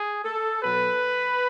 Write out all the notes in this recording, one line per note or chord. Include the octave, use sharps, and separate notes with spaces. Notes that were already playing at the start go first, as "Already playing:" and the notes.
Already playing: G#4
A4
B2 F#3 B4